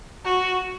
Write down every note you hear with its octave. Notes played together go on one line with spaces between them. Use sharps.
F#4